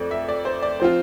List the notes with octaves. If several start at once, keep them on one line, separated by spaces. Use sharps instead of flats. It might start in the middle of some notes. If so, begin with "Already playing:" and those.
Already playing: F2 A3 C4 D5
E5
D5
C5
D5
F3 C4 F4 C5